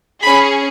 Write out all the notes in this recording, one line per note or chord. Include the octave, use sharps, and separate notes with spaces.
C#4 G#4 B5